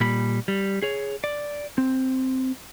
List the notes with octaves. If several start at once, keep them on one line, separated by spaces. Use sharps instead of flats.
A#2 G3 B5
G3
G#4 C#5
D5
C4